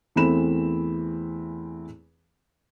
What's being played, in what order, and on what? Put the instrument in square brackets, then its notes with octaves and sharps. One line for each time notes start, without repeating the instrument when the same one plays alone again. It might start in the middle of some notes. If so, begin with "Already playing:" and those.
[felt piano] E2 E3 A3 C4 B5 E7